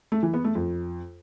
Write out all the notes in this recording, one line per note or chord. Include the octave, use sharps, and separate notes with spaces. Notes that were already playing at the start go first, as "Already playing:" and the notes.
A3
E3
B3
A3
F2